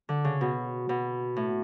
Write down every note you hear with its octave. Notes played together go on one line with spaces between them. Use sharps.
D3
C#3
B2
B2
A2